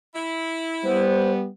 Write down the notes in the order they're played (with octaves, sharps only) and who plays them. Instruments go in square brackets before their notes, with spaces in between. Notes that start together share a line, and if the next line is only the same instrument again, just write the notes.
[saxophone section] E4
[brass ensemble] G3 B3 [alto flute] C5